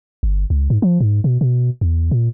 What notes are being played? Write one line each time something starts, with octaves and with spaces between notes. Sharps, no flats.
G1
C#2
G#2
F3
G#2
B2
B2
E2
A#2